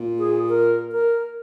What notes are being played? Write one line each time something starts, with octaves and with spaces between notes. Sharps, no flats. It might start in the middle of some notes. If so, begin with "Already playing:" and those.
Already playing: A#2
G#4
A#4
A#4